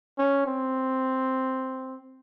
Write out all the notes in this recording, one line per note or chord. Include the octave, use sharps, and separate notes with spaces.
C#4
C4